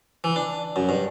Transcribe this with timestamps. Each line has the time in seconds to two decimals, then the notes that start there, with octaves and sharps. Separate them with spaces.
0.24 E3
0.36 D4
0.76 F#2
0.89 G2